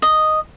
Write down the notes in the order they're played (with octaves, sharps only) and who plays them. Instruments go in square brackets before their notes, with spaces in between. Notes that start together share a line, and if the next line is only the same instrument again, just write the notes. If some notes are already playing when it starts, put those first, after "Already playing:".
[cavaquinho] D#5